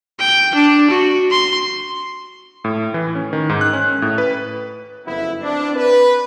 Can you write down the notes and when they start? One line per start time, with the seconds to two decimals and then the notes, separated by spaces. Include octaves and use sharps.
0.19 G5
0.55 D4
0.91 F#4
1.31 C6
2.64 A2
2.94 E3
3.15 C#4
3.33 D#3
3.49 G#2
3.61 F#6
3.73 C#4
4.02 A2
4.18 B4
5.06 F#1 F2 B3 E4
5.42 C4 D4
5.76 B4